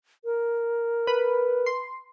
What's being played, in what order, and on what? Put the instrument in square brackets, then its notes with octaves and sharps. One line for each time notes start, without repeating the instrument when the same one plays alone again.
[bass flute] A#4
[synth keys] B4
C6